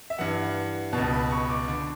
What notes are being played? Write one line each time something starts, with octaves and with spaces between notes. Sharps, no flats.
E5
G2 E3 F#5
B2 A5
C#2
B5
C#6
D6
D3 D6